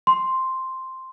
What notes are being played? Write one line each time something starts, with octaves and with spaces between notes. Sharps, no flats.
C6